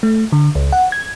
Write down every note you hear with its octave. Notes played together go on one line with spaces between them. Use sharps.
A3
D3
C#2
F#5
G#6